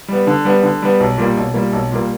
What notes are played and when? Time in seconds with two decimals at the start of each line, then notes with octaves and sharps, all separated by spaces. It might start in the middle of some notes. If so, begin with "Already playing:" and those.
0.08 G3 B3
0.27 D3
0.45 G3 B3
0.63 D3
0.82 G3 B3
1.00 B1
1.18 A#2 G3 A#3
1.37 B1
1.54 A#2 G3 A#3
1.72 B1
1.91 A#2 G3 A#3